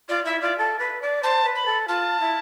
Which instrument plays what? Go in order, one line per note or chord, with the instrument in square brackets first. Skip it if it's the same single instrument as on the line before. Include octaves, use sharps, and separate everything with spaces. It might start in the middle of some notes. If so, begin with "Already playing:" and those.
[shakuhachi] F4 [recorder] D5
[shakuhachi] E4 [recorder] E5
[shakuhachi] F4 [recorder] D5
[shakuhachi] A4
B4
D5
[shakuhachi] C5 [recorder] A5
[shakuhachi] B4
[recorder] B5
[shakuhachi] A4
[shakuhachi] F4 [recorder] A5
[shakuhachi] E4